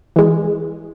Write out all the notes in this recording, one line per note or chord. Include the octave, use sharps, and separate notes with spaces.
E3 G#3